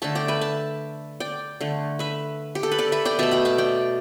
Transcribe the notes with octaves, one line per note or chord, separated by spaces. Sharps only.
D3 A3 E5 A5
D5 G5
B4 E5
E5 A5
D5 G5
D3 A3
B4 E5
G4
A4
B4
A4 D5
B4 E5
D5 G5
B2 A3 E5 A5
G5 B5
E5 A5
D5 G5